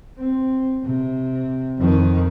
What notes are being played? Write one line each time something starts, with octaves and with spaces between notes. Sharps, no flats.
C4
C3
F2 D#3